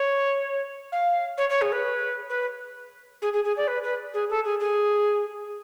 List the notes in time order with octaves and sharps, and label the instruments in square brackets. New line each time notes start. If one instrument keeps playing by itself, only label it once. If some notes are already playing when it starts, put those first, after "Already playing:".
Already playing: [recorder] C#5
F5
C#5
C#5
G#4
B4
B4
G#4
G#4
G#4
D5
B4
B4
G#4
A4
G#4
G#4